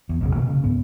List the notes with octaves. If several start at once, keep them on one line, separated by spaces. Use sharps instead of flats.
E2
B1 F#2 C#3
B2 D#3 A#3
C#3
C#2 G#2 B3